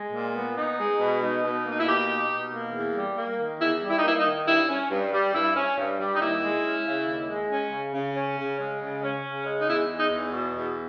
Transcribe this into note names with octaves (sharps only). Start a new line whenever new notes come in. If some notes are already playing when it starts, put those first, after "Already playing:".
Already playing: G#3
A#2
B3
D#4
G#3
B2
D#4
B2
A#3
D#4
E4
B2 G4
D#4
B2
A#3
E2
G3
A#3
D#3
E2 E4
G3
E4
D#4
A#3 E4
D#4
D#3
G2 E4
C#4
G2
G3
G2 E4
C#4
G2
G3
D#4
D#2 E4
G#3
C#4
C#3
D#2
G#3
C#4
C#3
C#3
C#4
C#3
G#3
C#3
C#4
C#3
G#3
D#4
E2 E4
G#3
D#4
E2
B2
E2